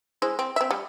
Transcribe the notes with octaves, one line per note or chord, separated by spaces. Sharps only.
G#3 E4 C5
C4
C4 E5
G3